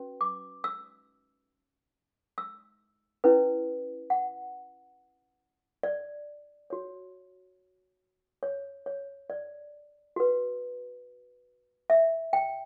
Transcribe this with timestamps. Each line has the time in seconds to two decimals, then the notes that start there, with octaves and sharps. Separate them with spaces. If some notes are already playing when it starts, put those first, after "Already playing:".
Already playing: C#4 F#4 B4
0.21 D6
0.64 E6
2.38 E6
3.24 C#4 E4 B4
4.10 F#5
5.83 D5
6.70 F#4 C#5
8.43 C#5
8.86 C#5
9.30 D5
10.16 F#4 B4
11.90 E5
12.33 G5